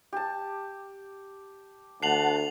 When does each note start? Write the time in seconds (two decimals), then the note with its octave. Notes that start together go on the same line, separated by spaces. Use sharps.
0.12 G4 A5
2.03 D2 F#5 A5 C7 F7 F#7